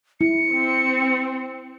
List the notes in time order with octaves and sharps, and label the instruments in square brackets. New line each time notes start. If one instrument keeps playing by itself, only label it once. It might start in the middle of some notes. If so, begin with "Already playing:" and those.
[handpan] E4 [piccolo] C#7
[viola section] C4